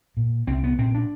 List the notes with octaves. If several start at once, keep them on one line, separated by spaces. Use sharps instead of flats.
A#2
C2 C4
B3
A#2 C4
D4